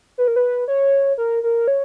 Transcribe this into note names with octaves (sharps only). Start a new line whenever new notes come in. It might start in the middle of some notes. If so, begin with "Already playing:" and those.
B4
A#4
B4
C#5
A#4
A#4
C#5